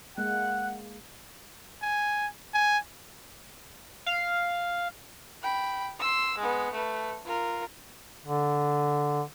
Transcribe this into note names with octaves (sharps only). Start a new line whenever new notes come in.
G#3 A#3 F#5 F#6
G#5
G#5
F5
G5 B5
C6 E6
G#3 B3
A3 B4
F4 A#4
D3